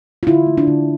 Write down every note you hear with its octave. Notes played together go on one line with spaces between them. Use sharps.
F4
D3 E4
A3
D4
D3